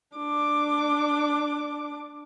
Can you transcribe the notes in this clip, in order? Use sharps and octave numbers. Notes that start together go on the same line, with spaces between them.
D4 D6